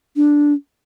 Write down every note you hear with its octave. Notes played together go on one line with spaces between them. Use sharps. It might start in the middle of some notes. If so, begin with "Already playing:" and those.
D4